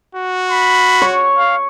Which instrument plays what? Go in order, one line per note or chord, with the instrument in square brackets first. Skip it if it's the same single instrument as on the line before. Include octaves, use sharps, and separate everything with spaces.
[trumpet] F#4
[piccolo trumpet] B5
[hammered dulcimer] C#5
[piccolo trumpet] F5